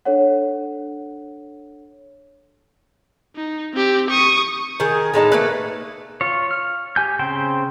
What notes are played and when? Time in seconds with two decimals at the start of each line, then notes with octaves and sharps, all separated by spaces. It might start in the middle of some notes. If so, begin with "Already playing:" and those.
0.05 D4 A4 C#5 F#5
3.36 D#4
3.74 C4 G4
4.10 C#6 D#6
4.80 D#3 G#4
5.14 A2 G#3 D#4 A5
5.32 A3 A#3 B4
6.21 F4 C#5
6.51 F6
6.96 G4 G#5 G6
7.19 C#3 C4 C5 G5